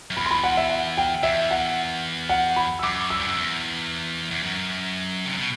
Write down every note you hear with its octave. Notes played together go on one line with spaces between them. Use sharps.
F#2
E2 B5
C6
B5
F#5
E5
F#5
G5
E2 E5
F#5
F#5
B5
E6
F#2 D6
E6
G2
F#2
E2
E2
F#2
C3
B2